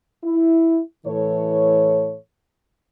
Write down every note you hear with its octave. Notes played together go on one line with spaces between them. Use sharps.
E4
A2 E3 A4 C#5